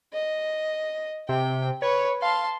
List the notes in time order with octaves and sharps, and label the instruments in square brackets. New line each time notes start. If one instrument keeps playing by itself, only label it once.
[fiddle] D#5
[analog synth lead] C3 [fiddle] G5
[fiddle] B4 [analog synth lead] C#5
[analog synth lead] F5 [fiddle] A5 C6